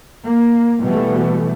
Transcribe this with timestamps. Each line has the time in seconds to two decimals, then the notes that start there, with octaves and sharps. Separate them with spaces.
0.24 A#3
0.80 B2 E3 G3 A3